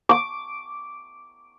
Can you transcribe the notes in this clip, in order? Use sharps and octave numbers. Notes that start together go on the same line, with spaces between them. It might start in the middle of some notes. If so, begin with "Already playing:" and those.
D6